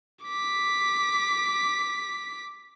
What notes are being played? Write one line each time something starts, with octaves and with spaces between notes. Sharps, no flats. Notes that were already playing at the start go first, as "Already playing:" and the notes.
D6 B6